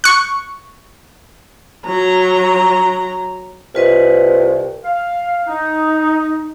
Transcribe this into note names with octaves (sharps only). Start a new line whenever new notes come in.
C#6 F#6
F#3 A#5
C2 F4 B4 D#5
F5
D#4